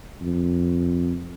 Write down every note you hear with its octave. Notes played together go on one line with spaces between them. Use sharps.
F2